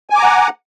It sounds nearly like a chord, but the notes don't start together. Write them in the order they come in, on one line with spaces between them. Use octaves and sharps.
G#5 D6 A#5 F#5